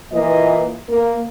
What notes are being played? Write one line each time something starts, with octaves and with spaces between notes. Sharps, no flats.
A#2 E3 A#3 F4 D#5
A#3